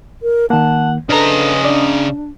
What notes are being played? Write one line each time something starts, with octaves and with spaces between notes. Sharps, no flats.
A#4
D#3 A#3 F#5 A5
C#3 D4 A4 B4 D#5 A#5
D4 D5